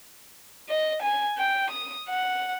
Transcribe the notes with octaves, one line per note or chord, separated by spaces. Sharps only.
D#5
G#5
G5
D#6
F#5